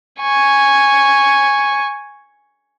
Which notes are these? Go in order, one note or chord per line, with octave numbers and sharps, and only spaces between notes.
G#5 C#6